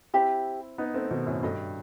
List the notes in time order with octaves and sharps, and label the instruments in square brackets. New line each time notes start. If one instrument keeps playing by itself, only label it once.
[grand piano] C4 E4 [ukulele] G4 C5 E5 B5
[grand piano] B3 D#4
A3 C4
B2 D#3
F#2 A2
[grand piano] G2 [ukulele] F#4 A4 D#5 G5